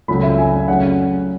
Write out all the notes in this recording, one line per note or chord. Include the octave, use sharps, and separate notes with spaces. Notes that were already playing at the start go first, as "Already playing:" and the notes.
C#2 C#3 F#3 A3 B5
E5
G#5
C#3 F#3 A3 F#5